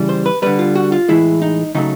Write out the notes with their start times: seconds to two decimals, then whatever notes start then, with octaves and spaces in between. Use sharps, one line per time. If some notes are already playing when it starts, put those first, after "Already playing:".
Already playing: C#3 E3 G3
0.09 C5
0.26 B4
0.42 D3 G3 B4
0.59 F4
0.76 F#4
0.92 F4
1.09 A2 E3 G#3 E4
1.42 D#4
1.75 C#3 F#3 A3 D#4